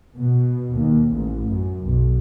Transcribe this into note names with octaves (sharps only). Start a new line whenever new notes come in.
B2
D#2
A1
F#2
B1